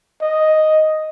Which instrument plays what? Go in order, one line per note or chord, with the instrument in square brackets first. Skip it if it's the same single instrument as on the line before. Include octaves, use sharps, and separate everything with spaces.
[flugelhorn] D#5